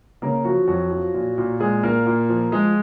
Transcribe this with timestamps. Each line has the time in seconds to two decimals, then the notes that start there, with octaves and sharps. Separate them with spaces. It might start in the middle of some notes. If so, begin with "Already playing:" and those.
0.22 C#3 A#3 A#4
0.45 F3 F#3 F#4
0.68 F2 F#3 F#4
0.91 F3
1.14 A#2
1.38 A#2
1.60 A#2 G#3 G#4
1.83 A#2 A#3 A#4
2.06 A#2
2.29 F3
2.52 F3 G#3 G#4